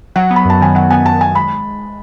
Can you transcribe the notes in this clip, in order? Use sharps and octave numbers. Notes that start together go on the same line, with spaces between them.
F#3 F#5
B3
B5
F#2 A5
D#3 G#5
F#3 F#5
B3 G#5
F#2 A5
D#3 G#5
G#3 B5